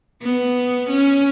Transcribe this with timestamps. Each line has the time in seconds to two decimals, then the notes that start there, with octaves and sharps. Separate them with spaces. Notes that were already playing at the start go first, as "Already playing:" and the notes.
0.21 B3
0.89 C#4